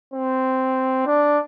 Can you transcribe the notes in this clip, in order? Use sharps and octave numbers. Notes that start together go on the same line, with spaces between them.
C4
D4